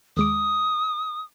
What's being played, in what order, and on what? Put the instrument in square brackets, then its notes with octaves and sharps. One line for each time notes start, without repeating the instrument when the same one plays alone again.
[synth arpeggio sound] D#2 G#3 D6 [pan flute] D#6